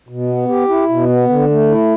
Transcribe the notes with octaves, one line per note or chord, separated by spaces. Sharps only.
B2
B3
G4
E4
B2
B3
D3
A3
E4